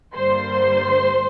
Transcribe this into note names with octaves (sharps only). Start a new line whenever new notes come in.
G2 D3 G3 A#3 C5 C6